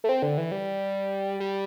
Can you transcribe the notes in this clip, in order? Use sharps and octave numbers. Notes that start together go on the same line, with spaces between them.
A3
C4
D3
E3
G3
G3